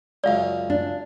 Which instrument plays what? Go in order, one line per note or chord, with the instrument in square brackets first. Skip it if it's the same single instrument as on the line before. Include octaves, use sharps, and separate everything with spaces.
[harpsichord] C#2 F#2 [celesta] D5 F5
[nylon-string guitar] D4